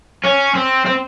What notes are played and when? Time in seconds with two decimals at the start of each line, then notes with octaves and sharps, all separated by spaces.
0.24 C#4
0.55 C4
0.86 C4